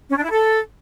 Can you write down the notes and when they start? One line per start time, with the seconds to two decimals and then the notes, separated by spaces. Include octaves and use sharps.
0.09 C#4
0.17 D4
0.24 E4
0.31 A4